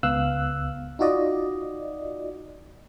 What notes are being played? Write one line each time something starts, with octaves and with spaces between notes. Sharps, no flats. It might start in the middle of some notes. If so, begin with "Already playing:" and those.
C#2 B3 F5 E6 F#6
D#4 F4 F#4 D5 D#5